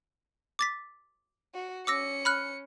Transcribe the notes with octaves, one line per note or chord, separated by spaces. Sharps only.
D6 A6 B6
F#4
C#4 D6 E6 A#6 C#7
B5 F6 F#6